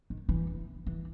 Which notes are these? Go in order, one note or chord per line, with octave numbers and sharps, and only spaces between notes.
D#3
E3
E3